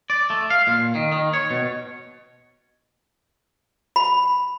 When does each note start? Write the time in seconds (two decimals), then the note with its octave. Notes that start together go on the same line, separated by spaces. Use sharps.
0.10 D5
0.30 A3
0.50 F5
0.67 A#2
0.95 D#3
1.12 D#3
1.33 C#5
1.50 B2
3.96 B5